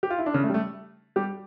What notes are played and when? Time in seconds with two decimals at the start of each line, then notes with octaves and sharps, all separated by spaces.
0.03 G4
0.10 F4
0.19 E4
0.26 D4
0.33 C#3 C#4
0.44 A3
0.49 G3
0.54 A3
1.16 G3 G4